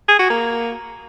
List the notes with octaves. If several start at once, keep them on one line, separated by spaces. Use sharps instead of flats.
G#4
F#4
A#3